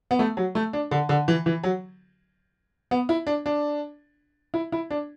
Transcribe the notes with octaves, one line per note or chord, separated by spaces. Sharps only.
B3
A3
F#3
A3
D4
D3
D3
E3
E3
F#3
B3
E4
D4
D4
E4
E4
D4